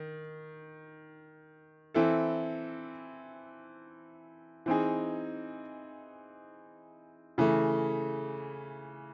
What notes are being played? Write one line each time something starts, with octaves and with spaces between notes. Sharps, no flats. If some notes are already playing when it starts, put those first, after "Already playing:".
Already playing: D#3
E3 C4 E4 A4
E3 C4 D#4 G#4
C#3 E3 A3